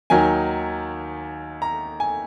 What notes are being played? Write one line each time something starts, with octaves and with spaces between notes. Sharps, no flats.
D#2 D#3 F#3 G#5
A#5
G#5